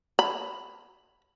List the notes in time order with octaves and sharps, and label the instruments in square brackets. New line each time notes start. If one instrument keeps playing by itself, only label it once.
[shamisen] B5